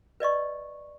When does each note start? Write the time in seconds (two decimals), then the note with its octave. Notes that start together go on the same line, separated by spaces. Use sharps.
0.20 B4 D5 D#5 C#6